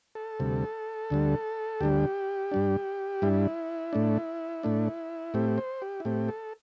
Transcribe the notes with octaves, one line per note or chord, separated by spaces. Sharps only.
A4
D2 C3 G3
D2 D3 G3
D2 D3 G3 G4
G2 G3 D4
G2 G3 D4 E4
A2 A3 D4
A2 A3 D4
A2 A3 C4 G4
C5
G4
E4
A2 A3 C4 G4
A4